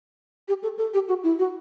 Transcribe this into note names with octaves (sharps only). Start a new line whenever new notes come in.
G4
A4
A4
G4
F#4
E4
F#4